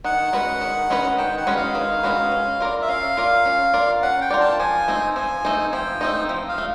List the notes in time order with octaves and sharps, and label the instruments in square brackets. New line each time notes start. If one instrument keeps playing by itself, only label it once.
[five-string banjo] D#3 [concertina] F#5
[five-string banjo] G#3 C#4 F#4 B4
D#3
G#3 C#4 F#4 B4
[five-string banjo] D#3 [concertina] G5
[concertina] F#5
[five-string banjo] G#3 C#4 F#4 B4
[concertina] F5
[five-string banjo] D#3
G#3 C#4 F#4 B4
C#4
F4 A#4 D5
[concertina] E5
[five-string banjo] C#4 [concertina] F5
[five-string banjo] F4 A#4 D5
C#4
F4 A#4 D5
[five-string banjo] C#4 [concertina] F#5
[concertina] G5
[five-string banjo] F4 A#4 D5
[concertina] A5
[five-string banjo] F3 [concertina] G#5
[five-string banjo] A3 C4 D#4
[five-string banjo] F3 [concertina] G#5
[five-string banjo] A3 C4 D#4
[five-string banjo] F3 [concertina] G5
[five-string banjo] A3 C4 D#4
F3
[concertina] F5
[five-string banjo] A3